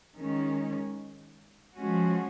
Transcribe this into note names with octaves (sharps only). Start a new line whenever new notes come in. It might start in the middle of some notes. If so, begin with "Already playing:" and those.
D#3 G#3 C#4
F3 G#3 C#4 F#4